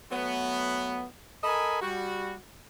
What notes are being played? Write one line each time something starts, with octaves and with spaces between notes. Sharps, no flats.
F#3 A3 B3
A4 A#4 D#5 G#5 B5
G3 F#4